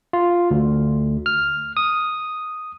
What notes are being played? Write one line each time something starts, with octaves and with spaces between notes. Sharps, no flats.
F4
D2
F6
D#6